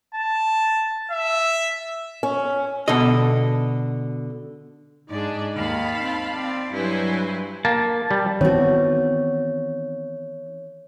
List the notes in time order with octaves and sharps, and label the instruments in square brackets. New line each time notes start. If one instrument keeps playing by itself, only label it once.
[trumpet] A5
E5
[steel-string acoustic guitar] C#4
[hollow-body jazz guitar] B2 D3 A4 D#5
[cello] G#2 [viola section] D4 G#4 D5 [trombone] D#4
[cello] D#2 [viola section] F5 A5 B5
[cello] C4
C4 D5
[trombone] G2 [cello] F#3 E4 [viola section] B4 C5 G#5
[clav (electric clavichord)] A#3 [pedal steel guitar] A5
[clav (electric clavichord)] G3
[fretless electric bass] D#3 E3 B3 [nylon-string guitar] C4 F#4 [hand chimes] C#5